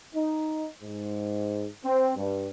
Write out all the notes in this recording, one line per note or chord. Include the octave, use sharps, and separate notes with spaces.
D#4
G#2
C4
G2